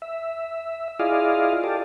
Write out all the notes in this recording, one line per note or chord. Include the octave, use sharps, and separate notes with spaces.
E5
E4 F4 G#4 D5 D#5 F5
G4 A4 D5